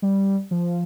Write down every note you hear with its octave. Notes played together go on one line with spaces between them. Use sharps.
G3
F3